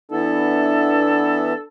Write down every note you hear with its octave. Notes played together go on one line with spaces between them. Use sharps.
E3 B3 D4 E4 A4